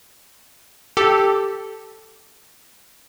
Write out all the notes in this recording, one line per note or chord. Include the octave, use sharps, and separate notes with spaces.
G4 A4